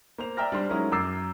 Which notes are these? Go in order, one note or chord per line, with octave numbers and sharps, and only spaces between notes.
A#3 C5 F7
D5 E5 G5 A#5 F6 A#6
G3 D4 C5 C6
F#3 G#3 C#4 D#4 E4 A#4
F#2 A#5 D6 E6 A6 C7